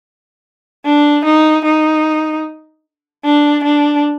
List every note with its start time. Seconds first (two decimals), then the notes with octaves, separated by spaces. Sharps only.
0.85 D4
1.25 D#4
1.65 D#4
3.24 D4
3.64 D4